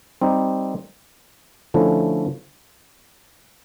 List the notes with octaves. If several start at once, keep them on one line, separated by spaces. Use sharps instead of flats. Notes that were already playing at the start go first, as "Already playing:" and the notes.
G3 C4 D#4 G4
D3 F3 A3 C#4 E4